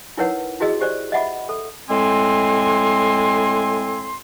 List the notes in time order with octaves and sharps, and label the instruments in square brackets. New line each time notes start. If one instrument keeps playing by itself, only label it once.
[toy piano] D#4 E4 A#4 B4 C#5 F#5
E4 F#4 G#4 D#5 E6
G4 C5 D5
D#5 E5 F#5 B5 D6
A4
[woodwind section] A2 G#3 C4 G#5 C6